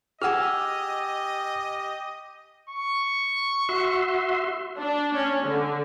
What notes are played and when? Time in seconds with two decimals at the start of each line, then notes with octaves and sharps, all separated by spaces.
0.22 G4 G#4 D#5 F#5 G#5 E6 F6
2.69 C#6
3.69 F#4 E5 C6
4.77 D4
5.14 C#4
5.43 D3